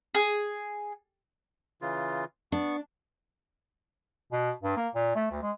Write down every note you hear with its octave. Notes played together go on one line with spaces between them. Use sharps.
G#4
C#3 E3 F4
B3 D4 C#6
B2
G2
A#3
A#2
A3
D2
G#3